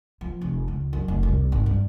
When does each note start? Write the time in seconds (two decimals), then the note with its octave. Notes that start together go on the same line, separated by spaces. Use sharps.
0.21 F3
0.41 F1
0.68 C#2
0.93 F#2
1.08 F1
1.23 C2
1.52 G#1
1.66 G2